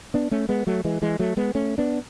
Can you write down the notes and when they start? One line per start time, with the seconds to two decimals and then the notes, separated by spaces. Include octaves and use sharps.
0.14 B3 D4
0.31 A3 C#4
0.49 G#3 B3
0.67 F#3 A3
0.85 E3 G#3
1.02 E3 G#3
1.19 F#3 A3
1.37 G#3 B3
1.55 A3 C#4
1.78 B3 D4